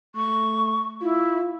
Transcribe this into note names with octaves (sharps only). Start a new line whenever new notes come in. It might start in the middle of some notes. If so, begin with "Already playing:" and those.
A3 C#6
E4 F4